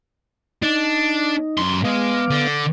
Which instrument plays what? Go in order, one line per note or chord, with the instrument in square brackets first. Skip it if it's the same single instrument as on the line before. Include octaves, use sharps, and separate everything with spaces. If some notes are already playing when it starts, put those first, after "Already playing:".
[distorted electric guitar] D4 [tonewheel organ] D#4
[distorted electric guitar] F#2 C6
[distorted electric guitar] G#3 [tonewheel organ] B3 F5 D6
[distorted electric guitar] D3